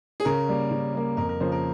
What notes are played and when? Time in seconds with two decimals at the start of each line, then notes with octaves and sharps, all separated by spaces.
0.20 G#4
0.25 C#3 A#4
0.48 G3 A#3
0.71 C#3
0.94 G3 A#3
1.17 F2 A#4
1.29 A#4
1.40 C#3 F3 A#3 C5
1.52 A#4